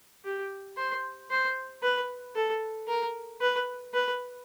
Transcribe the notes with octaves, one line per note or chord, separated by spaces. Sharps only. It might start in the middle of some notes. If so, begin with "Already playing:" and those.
G4
C5
C5
B4
A4
A#4
B4
B4